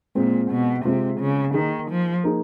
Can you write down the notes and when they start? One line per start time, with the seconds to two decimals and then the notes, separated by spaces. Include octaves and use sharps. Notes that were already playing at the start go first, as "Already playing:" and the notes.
0.15 A#2 G#3 C4 F4
0.50 B2
0.84 C3 G#3 C4 F4
1.19 C#3
1.54 D#3 A#3 D#4 G#4
1.90 F3
2.24 A#3 D#4 G#4